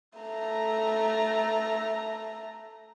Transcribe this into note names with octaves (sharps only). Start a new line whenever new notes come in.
A3 A#5